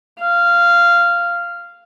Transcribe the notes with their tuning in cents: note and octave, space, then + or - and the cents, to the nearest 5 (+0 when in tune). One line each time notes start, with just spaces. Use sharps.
F5 -10